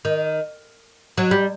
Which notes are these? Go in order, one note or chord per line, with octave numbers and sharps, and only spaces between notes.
D#3
F#3
G3